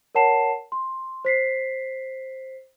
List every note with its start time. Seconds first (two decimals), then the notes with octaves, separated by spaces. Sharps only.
0.15 A#4 C#5 F#5 A5 C7 E7
0.72 C6
1.25 C5 B6 C7